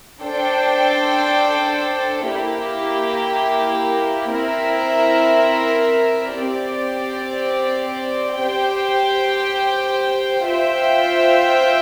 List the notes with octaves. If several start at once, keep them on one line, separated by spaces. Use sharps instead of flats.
D4 A4 C5 G5
A#3 E4 G4
C4 E4 A#4 E5
C4 G4 D5
G4 C5 G5
F4 C5 E5 G5